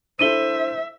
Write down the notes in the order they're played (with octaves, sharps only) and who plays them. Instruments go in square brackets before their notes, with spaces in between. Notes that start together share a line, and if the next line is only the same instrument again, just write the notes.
[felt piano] D4 E4 A4 [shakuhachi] C5 [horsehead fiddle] E5 [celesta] D#7 G7